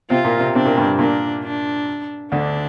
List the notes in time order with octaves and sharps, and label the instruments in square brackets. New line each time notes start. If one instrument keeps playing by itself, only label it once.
[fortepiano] C3 C4 [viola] F4
[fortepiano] A#2 A#3
C3 C4
[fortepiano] C3 C4 [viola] D4
[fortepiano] A#2 A#3
G2 G3
[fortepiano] A#2 A#3 [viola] D4
[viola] D4
[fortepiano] D2 D3 [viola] D4